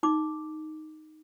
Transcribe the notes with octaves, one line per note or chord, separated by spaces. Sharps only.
D#4 D6